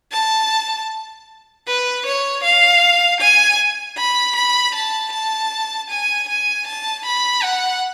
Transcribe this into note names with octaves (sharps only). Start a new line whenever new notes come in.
A5
B4
C#5
F5
G#5
B5
B5
A5
A5
G#5
G#5
A5
B5
F#5